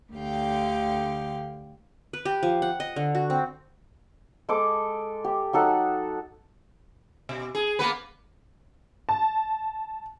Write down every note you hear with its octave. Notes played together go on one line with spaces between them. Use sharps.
D2 D3 G4 F5 G5
B4
G4
F3
F#5
D#5
D3
F#4
C4
G#3 A4 D6
G4
F#3 D#4 A4 F#5
B2
G#4
A#3 B3 B4
A5